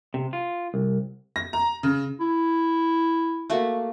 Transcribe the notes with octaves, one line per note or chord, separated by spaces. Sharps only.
C3
F4
C2
A#6
A#5
C#3
E4
A3 A#3 F#4